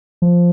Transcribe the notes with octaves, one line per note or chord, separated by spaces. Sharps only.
F3